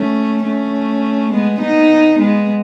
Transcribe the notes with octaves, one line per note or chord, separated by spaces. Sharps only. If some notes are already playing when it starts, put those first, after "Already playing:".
Already playing: A3 C#4
A3 C#4
G#3 B3
B3 D#4
G#3 B3